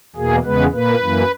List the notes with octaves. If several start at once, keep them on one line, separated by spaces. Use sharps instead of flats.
E2 B2 A#3 G#4
E2 C#3 G#3 B3 B4
A#2 A#3 B4
F#2 E3 A#3